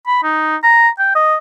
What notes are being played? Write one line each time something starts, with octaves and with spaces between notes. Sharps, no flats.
B5
D#4
A#5
G5
D#5